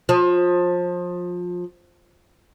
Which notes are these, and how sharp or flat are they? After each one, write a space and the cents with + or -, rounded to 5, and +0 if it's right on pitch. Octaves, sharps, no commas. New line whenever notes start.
F3 +25